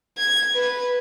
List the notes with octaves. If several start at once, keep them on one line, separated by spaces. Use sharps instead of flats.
G#6
B4